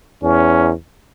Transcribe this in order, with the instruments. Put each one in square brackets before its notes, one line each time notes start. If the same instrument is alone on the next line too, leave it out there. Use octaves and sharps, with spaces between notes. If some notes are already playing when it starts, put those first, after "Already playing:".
[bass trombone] E2 [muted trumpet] C#4